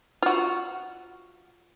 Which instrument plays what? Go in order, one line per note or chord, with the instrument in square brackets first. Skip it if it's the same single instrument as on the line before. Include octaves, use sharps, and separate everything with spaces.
[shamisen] F4 F#4